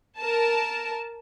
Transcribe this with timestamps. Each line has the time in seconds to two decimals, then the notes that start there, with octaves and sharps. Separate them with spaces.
0.18 A#4 A5